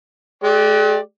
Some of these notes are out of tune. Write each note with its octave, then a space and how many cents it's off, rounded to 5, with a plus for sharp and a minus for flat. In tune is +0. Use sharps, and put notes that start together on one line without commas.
G#3 +45 G4 +0 D5 +0